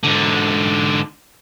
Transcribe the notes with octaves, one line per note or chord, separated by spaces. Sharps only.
G#2 D3